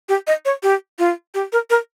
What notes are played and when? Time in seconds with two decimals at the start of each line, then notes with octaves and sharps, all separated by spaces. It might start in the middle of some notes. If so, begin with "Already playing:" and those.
0.09 G4
0.27 D#5
0.45 C#5
0.63 G4
0.99 F4
1.34 G4
1.52 A#4
1.70 A#4